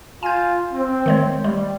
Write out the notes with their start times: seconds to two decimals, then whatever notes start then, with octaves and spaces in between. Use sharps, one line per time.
0.23 F4 G#5 G6
0.73 C4
1.06 D#3 G#3 C#5
1.44 G3 G#3